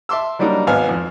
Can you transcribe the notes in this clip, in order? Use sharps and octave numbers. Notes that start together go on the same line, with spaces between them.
E5 A5 C6 D6 E6
F#3 G3 A#3 D4 D#4
G#1 B3 F5 G#5 F6
F2